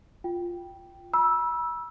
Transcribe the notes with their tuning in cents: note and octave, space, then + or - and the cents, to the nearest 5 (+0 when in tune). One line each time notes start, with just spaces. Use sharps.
F4 +0 G5 +0
B5 -40 E6 +0